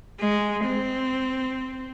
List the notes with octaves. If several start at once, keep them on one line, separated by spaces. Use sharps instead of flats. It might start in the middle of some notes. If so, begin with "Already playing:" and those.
G#3
C4